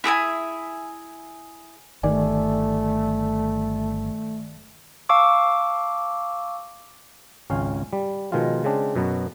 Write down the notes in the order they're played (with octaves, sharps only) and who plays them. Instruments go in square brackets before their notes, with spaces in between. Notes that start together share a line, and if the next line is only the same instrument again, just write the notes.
[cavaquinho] E4 G#4 E5 G#5
[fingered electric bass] G1 [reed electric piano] D#3 D5 G#5 [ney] A3
[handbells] F5 A5 C#6 D6 E6
[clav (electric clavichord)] G#1 C#2 C#4 F5
G3
B2 D#3 F3 G#3 F4
C#3 G#3 C4 D4
F#2 B2 F#3 B3